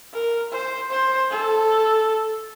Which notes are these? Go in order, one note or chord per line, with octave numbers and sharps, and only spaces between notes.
A#4
C5
C5
A4